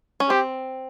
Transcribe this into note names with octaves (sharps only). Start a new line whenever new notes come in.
C#4
C4 G4